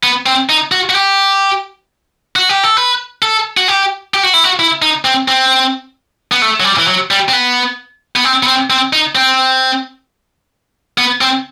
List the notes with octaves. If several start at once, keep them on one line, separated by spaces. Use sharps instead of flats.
B3
C4
D#4
F#4
F#4
G4
F#4
G4
A4
B4
A4
F#4
G4
G4
F#4
E4
F#4
E4
D#4
C4
C4
B3
A3
F#3
G3
E3
F#3
G3
C4
B3
B3
C4
B3
C4
C4
D#4
C4
B3
C4